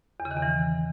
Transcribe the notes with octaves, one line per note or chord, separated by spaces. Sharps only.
E2
C#3
D#3
E2
E3